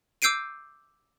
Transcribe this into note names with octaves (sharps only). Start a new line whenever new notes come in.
D6 E6 G6 C7 D7 D#7